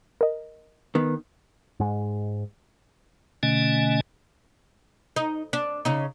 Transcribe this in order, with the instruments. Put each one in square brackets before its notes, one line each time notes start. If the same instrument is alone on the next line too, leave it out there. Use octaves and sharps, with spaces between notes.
[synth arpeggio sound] A#4 D#5
[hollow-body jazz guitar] D#3 B3
[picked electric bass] G#2 G#3
[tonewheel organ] B2 D3 A3 C#4 D#5 G#5
[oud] D#4
D4
C#3 D#4